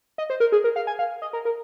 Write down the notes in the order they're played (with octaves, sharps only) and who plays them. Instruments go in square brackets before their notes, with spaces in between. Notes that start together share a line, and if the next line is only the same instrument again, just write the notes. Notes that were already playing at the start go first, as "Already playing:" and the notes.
[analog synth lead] D#5
C5
A#4
G#4
A#4
F5
G#5
F5
D#5
A#4
A#4